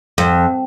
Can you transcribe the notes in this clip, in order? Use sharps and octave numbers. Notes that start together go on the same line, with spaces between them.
F2